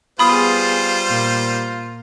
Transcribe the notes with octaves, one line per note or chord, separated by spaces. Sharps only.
G3 B3 F4 G#4 C5 B5 D#6
A#2